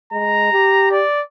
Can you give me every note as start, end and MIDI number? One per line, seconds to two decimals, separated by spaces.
0.13 0.49 56
0.13 0.90 82
0.52 1.02 67
0.91 1.22 74